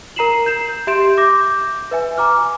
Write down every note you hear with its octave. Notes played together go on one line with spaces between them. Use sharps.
A#4 A#5 C7 E7 F#7
G6 C7 E7
G4 E5 C6 G6 D7 E7
D6 G6 A#6
B4 E5 G#5
G#5 A#5 D6 F6